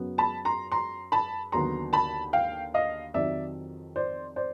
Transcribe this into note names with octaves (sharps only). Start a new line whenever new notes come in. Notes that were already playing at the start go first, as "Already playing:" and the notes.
Already playing: F#2 C#3 F#3 B3
A5 B5
A#5 C6
A#5 C6
A5 B5
D#2 D3 F#3 B3 A#5 C6
A5 B5
F5 G5
D#5 F5
F2 C3 D#3 F#3 D5 E5
C5 D5
C5 D5